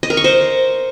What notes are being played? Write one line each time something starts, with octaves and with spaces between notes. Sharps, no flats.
D#5
A#4
C#6
C5